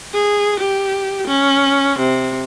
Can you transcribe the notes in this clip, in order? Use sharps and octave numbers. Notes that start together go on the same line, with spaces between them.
G#4
G4
C#4
C3